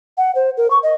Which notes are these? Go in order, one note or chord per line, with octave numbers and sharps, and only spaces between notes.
F#5
C5
A#4
C#6
D#5